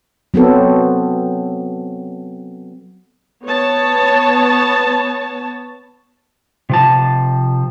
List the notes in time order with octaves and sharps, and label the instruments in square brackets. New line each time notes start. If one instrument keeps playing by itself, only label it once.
[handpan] F#3 B3 C4 A4
[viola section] B3 C#5 A5
[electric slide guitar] C3 F3 A5